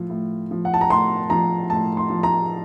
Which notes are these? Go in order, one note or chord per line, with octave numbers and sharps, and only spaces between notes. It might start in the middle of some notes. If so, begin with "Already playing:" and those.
Already playing: A2 F3
A2
F3
F#5
A5
A#5
A2 C6
F3 A#5
A2 A5
C6
F3
A#5